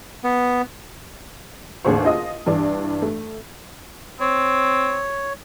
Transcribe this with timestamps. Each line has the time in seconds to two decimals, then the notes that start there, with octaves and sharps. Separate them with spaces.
0.24 B3
1.85 A1 D#2 D3 G#4 C5 C#6
2.04 F4 D#5 D#6
2.46 G2 E3 D4
3.02 A3
4.21 C4 C#5